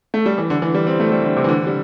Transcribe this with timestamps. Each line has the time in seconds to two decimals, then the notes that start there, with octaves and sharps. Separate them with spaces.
0.14 A3
0.26 G3
0.38 E3
0.50 D3
0.62 E3
0.74 G3
0.87 C4
1.00 A3
1.12 G3
1.24 D3
1.37 C3
1.44 E3
1.49 D3
1.67 G3